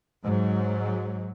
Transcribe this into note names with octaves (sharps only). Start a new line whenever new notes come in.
G#2 F#3